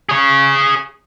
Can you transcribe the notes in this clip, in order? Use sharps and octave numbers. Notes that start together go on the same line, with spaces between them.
G#4 C#5